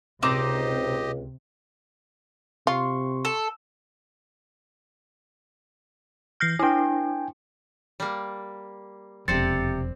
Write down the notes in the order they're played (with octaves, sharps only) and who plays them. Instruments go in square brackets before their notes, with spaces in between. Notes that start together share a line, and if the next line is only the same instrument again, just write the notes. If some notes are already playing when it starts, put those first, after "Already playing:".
[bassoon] C#2 [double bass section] C3 [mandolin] C4 D#4 D6 [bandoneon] G4 D#5
[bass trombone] C3 [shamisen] F4 [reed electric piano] C6 C#6
[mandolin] A4
[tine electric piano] E3 G6 [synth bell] F6 A#6 C7
[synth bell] D4 E4 [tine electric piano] G5 G#5
[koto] G3 A#3
[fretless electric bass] E1 F2 [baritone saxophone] C3 [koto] C4 C5 D5 [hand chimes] A6 C#7